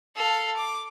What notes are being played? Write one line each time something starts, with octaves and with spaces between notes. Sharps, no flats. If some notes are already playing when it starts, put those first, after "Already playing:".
A4 F5
D6